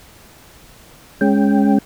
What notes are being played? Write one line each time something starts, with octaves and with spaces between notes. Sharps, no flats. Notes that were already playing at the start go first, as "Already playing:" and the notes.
G#3 C#4 G5